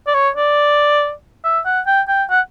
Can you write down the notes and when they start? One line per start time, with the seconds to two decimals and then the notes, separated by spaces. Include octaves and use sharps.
0.07 D5
0.14 C#5
0.36 D5
1.44 E5
1.65 F#5
1.86 G5
2.08 G5
2.30 F#5